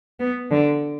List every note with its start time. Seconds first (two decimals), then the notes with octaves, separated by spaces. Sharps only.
0.21 B3
0.51 D3